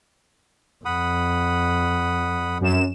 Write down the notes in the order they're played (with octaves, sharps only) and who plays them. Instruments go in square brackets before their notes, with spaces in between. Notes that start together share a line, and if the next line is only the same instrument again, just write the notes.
[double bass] F2 [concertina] F#5 B5 D#6
[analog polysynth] F#2 E7